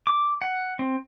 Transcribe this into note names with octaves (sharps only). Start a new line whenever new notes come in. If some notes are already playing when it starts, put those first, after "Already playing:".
D6
F#5
C4